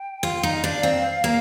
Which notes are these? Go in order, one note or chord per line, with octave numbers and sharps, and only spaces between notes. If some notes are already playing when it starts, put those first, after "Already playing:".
Already playing: G5
F4
D#4 F5
D4
C4
A#3